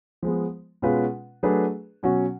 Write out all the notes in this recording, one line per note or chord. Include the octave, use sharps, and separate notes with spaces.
F3 G#3 B3
B2 G#3 C#4 F4 B4
F#3 A3 D4 G#4 B4
B2 F#3 C#4 F#4